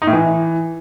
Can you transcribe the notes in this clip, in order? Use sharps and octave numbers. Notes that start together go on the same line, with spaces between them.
D#4
A2
E3